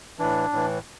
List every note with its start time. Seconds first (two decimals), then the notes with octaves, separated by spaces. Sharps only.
0.19 A2 E3 D4
0.52 A2 E3